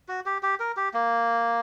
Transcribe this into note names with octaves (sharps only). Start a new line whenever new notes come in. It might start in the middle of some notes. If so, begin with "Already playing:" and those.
F#4
G4
G4
A#4
G4
A#3